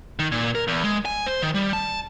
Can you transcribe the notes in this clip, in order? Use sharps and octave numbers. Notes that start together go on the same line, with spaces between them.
D#3
A#2
A#4
E2
G#3
G#5
C5
D#3
G3
A5